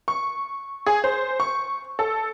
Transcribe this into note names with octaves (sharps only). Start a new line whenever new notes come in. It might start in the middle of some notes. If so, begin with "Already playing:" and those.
C#6
G#4
C5
C#6
A4